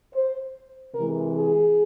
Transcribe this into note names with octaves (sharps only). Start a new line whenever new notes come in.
C5
C3 E3 G#3 A#4
G#4